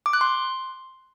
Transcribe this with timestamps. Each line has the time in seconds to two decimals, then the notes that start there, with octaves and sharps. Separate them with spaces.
0.06 D6
0.13 F#6
0.21 C6